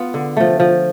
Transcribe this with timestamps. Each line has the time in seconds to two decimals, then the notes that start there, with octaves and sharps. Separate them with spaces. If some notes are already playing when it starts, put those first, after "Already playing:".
Already playing: B3 F4
0.14 D3
0.37 F3 A3
0.60 F3